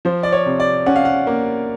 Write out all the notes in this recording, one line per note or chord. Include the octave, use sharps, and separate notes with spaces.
F3 C5
D5
C#5
C3
D5
C#4 F#5
F5
F#5
A#3